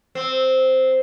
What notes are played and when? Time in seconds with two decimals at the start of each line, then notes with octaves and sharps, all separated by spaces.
0.15 C4